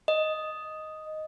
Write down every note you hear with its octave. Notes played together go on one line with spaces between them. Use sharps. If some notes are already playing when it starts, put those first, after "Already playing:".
D#5